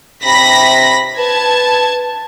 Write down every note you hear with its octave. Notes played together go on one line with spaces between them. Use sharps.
C3 B5 A#6 B6
B4 A5 G#6